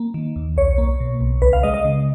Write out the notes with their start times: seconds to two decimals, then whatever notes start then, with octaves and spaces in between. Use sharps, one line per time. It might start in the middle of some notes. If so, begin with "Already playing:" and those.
Already playing: A#3
0.14 D#3
0.36 D#2
0.57 B1 C#5
0.78 A#3
1.00 B2
1.21 B1
1.42 C#2 B4
1.53 F5
1.63 G#3 D#5
1.74 D#5
1.85 C#3